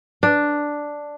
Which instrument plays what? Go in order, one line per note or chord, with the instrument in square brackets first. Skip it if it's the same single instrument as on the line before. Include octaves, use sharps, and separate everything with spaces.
[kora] D4